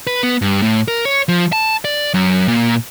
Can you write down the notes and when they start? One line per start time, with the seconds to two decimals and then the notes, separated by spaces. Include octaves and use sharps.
0.07 B4
0.23 B3
0.42 G2
0.62 A2
0.88 A#4
1.05 C#5
1.28 F3
1.53 A5
1.85 D5
2.14 F#2
2.48 A#2